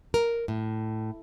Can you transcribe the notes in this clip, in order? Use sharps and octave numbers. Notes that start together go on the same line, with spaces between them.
A#4
A2